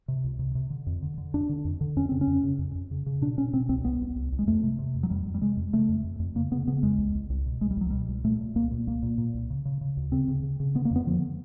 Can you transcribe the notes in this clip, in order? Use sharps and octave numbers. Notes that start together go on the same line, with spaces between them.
C3
C#2
C3
C3
D3
F2
D3
D3
F2 D4
D3
F2
D3
F2 C#4
C#3 C4
C#4
F2
C#3
F2
F2
C#3
C#3
B2 D4
B2 C#4
B2 C4
C2 C4
C2 B3
C2
C2
C2
G#3
F2 A3
C3
C3
F2
F#3
F2 G3
F2
G3
C3 G#3
F2
C#3 A3
F2
F2
F2
C#3 A#3
C#3 B3
C#3 B3
F2 G#3
C2
C2
C2
B2
C2 G#3
G3
C2 F#3
B2 G3
C2
A#2 A3
A#2
C2 A#3
A#2
C2 A#3
A#2
A#2
C2
C#3
C#3
C#3
D2
C#3 C4
C#3
C#3
C#3
D3 B3
A#3
F2 B3
D3 F3